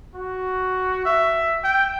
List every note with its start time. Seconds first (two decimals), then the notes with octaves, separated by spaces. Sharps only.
0.15 F#4
1.05 E5
1.64 G5